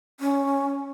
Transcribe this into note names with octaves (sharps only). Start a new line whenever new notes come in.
C#4